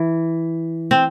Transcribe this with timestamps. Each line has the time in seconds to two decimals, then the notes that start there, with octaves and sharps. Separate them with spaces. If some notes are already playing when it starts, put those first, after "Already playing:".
Already playing: E3
0.91 C4